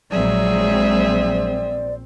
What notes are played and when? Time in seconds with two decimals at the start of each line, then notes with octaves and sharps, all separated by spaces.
0.11 A#1 F#3 G#3 C4 G#4 D5 E5